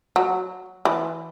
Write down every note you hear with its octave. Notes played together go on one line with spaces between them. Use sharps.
F#3
E3